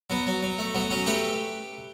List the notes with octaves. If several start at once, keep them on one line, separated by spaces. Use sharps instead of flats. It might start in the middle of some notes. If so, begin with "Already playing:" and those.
F#3 B3
F#3
F#3
A3
F#3 B3
F#3 C#4
A3 G4 B4